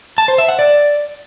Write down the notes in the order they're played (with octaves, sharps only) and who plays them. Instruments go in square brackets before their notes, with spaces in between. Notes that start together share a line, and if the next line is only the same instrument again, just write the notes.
[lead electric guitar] A5
C5
E5
F#5
D5